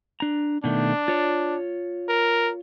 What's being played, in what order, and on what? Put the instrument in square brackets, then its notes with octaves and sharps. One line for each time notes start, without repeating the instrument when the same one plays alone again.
[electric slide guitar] D4 A#5
[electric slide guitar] B2 D#3 A3 [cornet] D4
[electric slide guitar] F4 C#5
[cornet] A#4